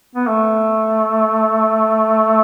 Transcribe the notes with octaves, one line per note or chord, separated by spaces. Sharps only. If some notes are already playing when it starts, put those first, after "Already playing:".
B3
A3